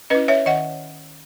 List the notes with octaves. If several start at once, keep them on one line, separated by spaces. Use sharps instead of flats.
C#4 E4 B4 D#5
C#5 E5
D#3 D#5 F#5